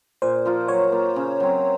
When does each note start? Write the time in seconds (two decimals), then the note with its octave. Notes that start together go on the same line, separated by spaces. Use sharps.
0.22 A#2 C5
0.45 F3 A#3 F4
0.68 F#3 C#5
0.92 A#3 F4
1.16 C#3
1.40 F#3 C4